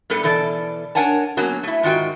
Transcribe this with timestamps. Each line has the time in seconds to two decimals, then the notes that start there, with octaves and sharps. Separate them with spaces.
0.10 A2 G3 B3 A4
0.23 B2 E3 A4 D5
0.95 D4 A#4 C#5 F#5 G#5 A5
1.37 F#3 A#3 B3 C#4 F#4
1.63 A3 E4
1.83 G#2 D#3 F4 F#4 G5